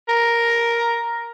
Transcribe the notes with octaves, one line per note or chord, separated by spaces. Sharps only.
A#4